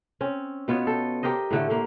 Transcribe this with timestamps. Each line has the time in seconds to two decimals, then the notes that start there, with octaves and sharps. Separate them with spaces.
0.21 C4 C#4
0.68 B2 B3 F4 C#5
0.87 A4 G5
1.23 G4 A#4 C5 D#5
1.51 A2 D3 A3
1.70 D3 A#3